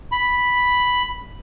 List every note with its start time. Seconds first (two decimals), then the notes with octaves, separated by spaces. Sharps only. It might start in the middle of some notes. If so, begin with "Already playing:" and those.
0.12 B5